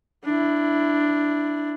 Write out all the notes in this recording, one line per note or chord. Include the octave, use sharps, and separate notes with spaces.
D4 E4